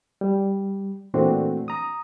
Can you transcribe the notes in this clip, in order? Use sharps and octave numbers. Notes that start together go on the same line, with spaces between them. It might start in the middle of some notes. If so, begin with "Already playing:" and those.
G3
A#2 E3 A3 C4 D4 F#4
A#5 D#6